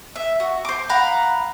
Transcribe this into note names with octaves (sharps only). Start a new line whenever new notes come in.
E5
F#4
C5 D6
F5 F#5 A#5 B5